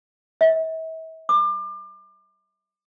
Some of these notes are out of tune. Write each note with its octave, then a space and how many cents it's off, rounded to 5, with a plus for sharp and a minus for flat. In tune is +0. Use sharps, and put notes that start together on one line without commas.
E5 -40
D6 +30